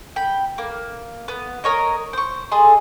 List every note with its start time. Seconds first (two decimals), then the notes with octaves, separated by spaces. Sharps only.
0.16 G5 B5
0.58 A#3
1.28 B3
1.64 A#4 C#5 D#5
2.13 C5 C#6
2.52 G#4 A4 D#5 C6